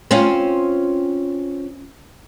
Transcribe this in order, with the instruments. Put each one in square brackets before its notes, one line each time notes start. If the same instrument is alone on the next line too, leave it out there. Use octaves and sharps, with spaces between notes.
[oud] C4 C#4 F4